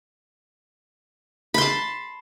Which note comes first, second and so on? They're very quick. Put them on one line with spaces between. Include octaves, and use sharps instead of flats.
B5 C6 A5